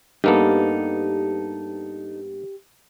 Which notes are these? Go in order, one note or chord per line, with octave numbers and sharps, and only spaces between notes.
G2 A#3 B3 D#4 G4 A4